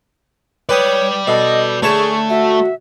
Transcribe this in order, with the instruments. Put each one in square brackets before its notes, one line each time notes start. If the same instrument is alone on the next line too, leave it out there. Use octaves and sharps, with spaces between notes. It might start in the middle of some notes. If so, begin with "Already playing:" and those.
[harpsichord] B4 D#6 [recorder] C#5 [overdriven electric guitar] D5 G5
[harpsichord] B2 [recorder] A4 [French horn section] D#5
[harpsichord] D3 C#5 A5 [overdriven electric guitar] A3 [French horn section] G#4 [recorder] C#6
[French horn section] F#4 [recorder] E5